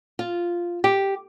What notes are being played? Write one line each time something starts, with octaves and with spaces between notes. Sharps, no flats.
F4
G4